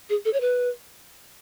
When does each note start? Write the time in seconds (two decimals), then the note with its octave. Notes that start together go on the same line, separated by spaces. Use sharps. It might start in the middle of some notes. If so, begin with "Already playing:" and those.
0.09 G#4
0.25 A4
0.33 C#5
0.40 B4